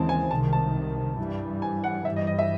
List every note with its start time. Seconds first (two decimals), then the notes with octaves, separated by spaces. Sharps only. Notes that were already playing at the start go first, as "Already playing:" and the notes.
Already playing: D#2 C#3 E3 G#3 C4 A5
0.09 G#5
0.31 C2 C3 D#3 A5
0.53 A5
1.18 G2 E3 G3
1.62 G#5
1.84 F#5
2.05 G2 E3 G3 E5
2.16 D#5
2.27 D#5
2.39 E5